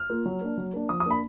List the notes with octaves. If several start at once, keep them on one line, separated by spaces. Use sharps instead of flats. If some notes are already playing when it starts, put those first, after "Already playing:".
Already playing: F6
A#3 F4
F#3
A#3 D4
F#3
A#3 D4
F3 D#6
D#6
A#3 D4 B5